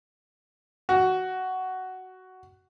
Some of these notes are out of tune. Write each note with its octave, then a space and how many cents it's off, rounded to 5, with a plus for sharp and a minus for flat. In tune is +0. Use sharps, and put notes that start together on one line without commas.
F#4 +10